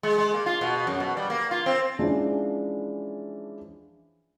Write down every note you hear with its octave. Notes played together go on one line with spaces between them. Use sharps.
G#3
G#3
A#3
F4
B2
B2
F#2
B2
G3
A#3
F4
C4
E3 F3 G#3 C#4 D4